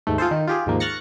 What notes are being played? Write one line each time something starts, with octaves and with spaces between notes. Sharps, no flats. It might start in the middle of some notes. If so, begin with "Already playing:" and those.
D#2 G#2 A3
F4 G#4 A4 C5
D#3 D#4
F4 G4 G#4
D#2 G#2 F3 A#3
C#6 F6 F#6 A6 A#6 C#7